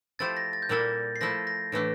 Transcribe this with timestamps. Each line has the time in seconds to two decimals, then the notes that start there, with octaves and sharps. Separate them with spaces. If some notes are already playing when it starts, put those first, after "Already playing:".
0.19 F3 A3 E4 G4 C5 A6
0.37 A#6
0.53 A6
0.62 G6
0.69 A#2 G3 A#3 E4 A4 A6
1.16 C7
1.21 F3 A3 E4 A#6
1.47 A#6
1.72 A2 E3 A3 D4